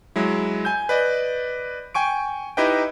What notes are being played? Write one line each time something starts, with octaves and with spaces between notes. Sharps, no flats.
F#3 G#3 E4
G#5 G6
B4 D5 D#5
G5 G#5 C#6 D7
D#4 E4 G4 B4 D#5 G5